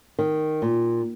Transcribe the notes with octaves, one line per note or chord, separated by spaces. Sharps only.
D#3
A#2